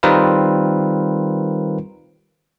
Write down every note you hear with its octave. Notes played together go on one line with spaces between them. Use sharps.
D#3 G3 C4 F4 A#4 B4